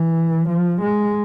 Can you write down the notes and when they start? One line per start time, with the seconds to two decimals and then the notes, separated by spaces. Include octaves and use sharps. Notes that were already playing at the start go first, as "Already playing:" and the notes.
Already playing: E3
0.49 F3
0.81 G#3